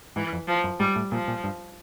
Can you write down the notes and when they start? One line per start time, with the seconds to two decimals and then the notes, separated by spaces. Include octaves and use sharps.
0.16 G#2 E3
0.33 F2
0.48 F3
0.64 F#2
0.80 G#2 G3
0.96 A2
1.11 A#2 F3
1.28 A#2
1.44 G2